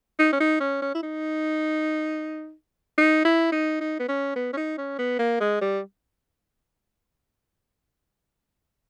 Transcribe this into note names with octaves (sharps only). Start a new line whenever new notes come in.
D#4
C#4
D#4
C#4
C#4
E4
D#4
D#4
E4
D#4
D#4
B3
C#4
B3
C#4
D#4
C#4
B3
A#3
G#3
G3